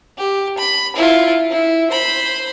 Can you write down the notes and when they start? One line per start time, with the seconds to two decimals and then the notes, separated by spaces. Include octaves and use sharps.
0.17 G4
0.58 B5
0.96 E4 F4
1.50 E4
1.91 C5 B5